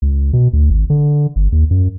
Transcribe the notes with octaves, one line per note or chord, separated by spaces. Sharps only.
C#2
B2
D2
G#1
D3
G1
D#2
F#2